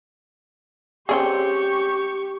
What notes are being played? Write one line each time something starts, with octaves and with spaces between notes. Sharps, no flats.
C4 C#4 G4 G#4 C#6